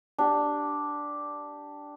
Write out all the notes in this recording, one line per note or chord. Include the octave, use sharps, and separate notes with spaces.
D4 G4